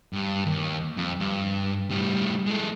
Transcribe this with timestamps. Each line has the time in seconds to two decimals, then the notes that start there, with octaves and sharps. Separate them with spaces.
0.13 G2
0.46 D#2
0.97 F2
1.20 G2
1.91 A2 G3
2.46 G#3 A4